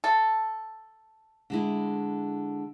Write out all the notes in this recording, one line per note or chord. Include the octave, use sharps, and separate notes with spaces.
A4
D3 G#3 E4